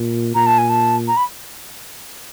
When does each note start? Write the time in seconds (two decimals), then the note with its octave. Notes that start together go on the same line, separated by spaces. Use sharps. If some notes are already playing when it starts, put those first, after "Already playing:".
Already playing: A#2
0.35 A#2 A#5
0.46 A5
0.58 G#5
0.69 A5
1.08 A#5
1.17 B5